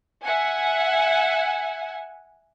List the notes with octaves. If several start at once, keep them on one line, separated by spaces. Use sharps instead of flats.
E5 F#5 G#5